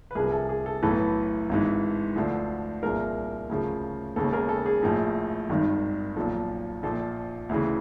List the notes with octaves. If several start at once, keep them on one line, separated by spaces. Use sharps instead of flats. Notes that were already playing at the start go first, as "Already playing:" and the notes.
B4
C2 C3 F3 G#4 A#4
A4
G#4
A4
B1 A2 E3 A4 B4
G#1 G#2 E3
D2 D3 F3
C2 A#2 F3 G#4 A#4
D2 C#3 F3
E1 D#2 C#3 A4
G#4 A#4
A4
G#4
A#1 A2 F3
G#1 G2 D#3
B1 A#2 F3 A4
A#1 A#2 F3 A4
D2 C#3 E3